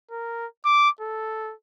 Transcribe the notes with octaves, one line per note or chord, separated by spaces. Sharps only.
A#4
D6
A4